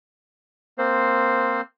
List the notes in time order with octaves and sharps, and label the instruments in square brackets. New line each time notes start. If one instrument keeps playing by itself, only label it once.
[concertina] A#3 C4 C5